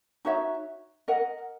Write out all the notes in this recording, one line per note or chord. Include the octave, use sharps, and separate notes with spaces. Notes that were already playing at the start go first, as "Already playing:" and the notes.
D#4 F#4 C#5 E5
A#4 D#5 F#5